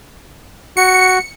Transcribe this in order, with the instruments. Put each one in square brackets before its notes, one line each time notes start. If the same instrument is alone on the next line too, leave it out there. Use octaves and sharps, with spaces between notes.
[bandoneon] F#4 [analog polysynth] C#7